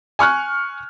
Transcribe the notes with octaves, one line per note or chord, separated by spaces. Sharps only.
G#5 C#6 F6 F#6